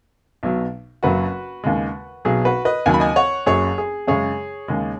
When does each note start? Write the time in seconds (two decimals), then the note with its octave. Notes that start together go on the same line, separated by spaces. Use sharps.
0.43 B1 B2 F#3
1.03 F#1 F#2 C#3 F#3 F#4 B4
1.64 D#2 C#3 G#3
2.25 B1 B2 F#3 G#4
2.45 F#4 B4
2.65 B4 D#5
2.86 D#2 C#3 F#3 G#5
2.94 B5
3.00 D#5 G#5
3.16 C#5 F#5
3.46 F#1 F#2 F#3 G#4 C#5
3.78 G#4
4.07 F#2 C#3 G#3 G#4 C#5
4.68 D#2 C#3 G#3